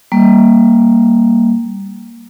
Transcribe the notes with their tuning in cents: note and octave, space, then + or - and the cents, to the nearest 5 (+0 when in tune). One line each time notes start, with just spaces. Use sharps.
G3 +0 A#3 +0